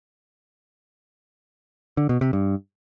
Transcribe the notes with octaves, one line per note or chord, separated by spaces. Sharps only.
D3
B2
C3
G2